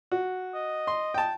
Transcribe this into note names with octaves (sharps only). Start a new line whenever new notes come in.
F#4
D#5
C6
G5 A5